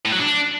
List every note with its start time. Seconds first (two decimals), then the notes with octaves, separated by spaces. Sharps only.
0.05 A2
0.12 F#3
0.19 D4